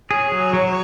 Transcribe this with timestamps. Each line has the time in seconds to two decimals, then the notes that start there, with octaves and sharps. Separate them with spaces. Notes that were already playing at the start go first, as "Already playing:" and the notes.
0.11 G#4 C#5
0.32 F#3
0.53 F#3